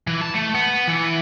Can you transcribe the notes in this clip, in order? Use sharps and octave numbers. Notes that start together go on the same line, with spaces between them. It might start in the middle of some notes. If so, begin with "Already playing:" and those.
E3
A5
A3
B3
E3